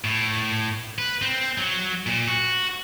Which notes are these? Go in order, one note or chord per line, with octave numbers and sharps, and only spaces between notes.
A2
B4
C4
F#3
A#2
F#4